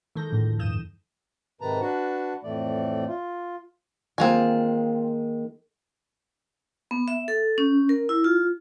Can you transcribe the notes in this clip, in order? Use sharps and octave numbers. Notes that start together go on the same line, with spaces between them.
D#3 G#3 A4 G6 A#6
A2 D3 E3 F3
D2
E2 G2 D#6 G6 E7
G#2 C3 D#3 B4 A5 A#5
D4 F#4 B4 F#5 A5
F2 A2 E3 A3 D5
F4
D#3 G#3 A#3 C4 F4 G#5
B3
E5
A4
C#4
A#4
E4
F4